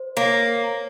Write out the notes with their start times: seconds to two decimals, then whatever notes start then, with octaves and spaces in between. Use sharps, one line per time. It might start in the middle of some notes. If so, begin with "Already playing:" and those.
Already playing: C5
0.16 A#3 C#5